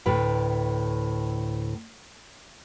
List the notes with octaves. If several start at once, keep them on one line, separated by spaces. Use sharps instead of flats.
D2 A2 B4 G5